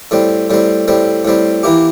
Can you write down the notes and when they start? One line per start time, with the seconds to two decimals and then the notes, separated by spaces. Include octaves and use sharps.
0.11 A2 G3 C4
0.50 A2 G3 C4
0.88 A2 G3 C4
1.25 A2 G3 C4
1.63 E3 A#3 E4 G4